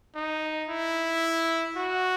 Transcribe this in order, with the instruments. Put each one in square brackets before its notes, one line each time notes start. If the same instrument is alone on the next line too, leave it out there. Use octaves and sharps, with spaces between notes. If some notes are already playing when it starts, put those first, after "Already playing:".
[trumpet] D#4
E4
F#4